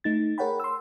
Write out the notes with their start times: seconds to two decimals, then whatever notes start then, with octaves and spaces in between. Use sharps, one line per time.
0.04 A3 D#4 A6
0.38 G#4 A#4 C#5 F#5 G5 B5
0.60 C6 E6